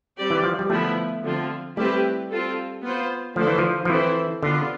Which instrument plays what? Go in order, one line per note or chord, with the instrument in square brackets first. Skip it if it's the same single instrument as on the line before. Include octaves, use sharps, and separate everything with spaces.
[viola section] G3 C4 G4 D5
[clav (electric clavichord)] E3
F3
G3
[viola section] D3 F3 B3 E4 [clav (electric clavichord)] A3
[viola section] D3 F3 C4 F4
[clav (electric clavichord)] G3 [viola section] A3 C4 E4 G4 B4
[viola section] C4 F4 A4
B3 F4 C5
[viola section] D3 A3 D4 A4 C5 [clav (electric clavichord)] F3
[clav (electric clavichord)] E3
F3
F3
[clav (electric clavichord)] E3 [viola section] C4 E4 A4 C5
[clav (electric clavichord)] D3 [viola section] B3 D4 F4